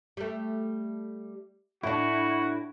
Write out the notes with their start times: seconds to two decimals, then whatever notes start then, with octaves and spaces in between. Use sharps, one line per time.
0.17 G3 A3
1.83 A2 D4 E4 F#4